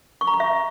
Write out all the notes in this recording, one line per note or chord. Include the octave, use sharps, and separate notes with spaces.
C#6
A#5
C#6
E5